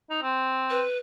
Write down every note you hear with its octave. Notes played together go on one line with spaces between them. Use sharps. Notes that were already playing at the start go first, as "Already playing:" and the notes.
D#4
C4
B4